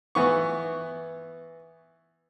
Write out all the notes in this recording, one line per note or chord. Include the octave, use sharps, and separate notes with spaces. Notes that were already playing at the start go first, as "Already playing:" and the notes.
E3 B3 C#6